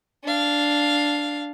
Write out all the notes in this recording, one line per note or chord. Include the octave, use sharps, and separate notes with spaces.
D4 F5